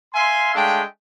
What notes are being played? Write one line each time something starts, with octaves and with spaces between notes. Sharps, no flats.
E5 F5 G#5 C6
G#3 A3 D4 F5 G5